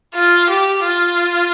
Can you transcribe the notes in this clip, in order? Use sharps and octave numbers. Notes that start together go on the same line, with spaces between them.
F4
G4
F4